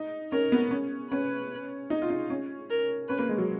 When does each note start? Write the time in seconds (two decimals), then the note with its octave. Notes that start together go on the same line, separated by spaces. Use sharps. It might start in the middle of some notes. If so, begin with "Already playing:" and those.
Already playing: D#4
0.32 C#4 A#4
0.52 B3
0.71 C#4
1.11 C#4 B4
1.90 D#4
2.02 F4
2.10 D#4
2.30 C#4
2.70 A#4
3.09 C#4 B4
3.19 A#3
3.29 G#3
3.38 F#3